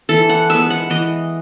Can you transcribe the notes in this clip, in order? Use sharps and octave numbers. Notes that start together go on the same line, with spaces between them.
E3 A4
F#5
G#3 B3 E5
F#5
E3 D#5